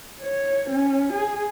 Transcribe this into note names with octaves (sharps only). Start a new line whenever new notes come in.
C#5
C#4
G#4